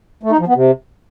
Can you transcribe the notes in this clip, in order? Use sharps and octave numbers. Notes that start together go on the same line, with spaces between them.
A3
D#4
F3
B3
C3